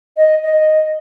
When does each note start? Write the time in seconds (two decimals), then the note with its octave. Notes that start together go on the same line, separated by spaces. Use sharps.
0.17 D#5
0.43 D#5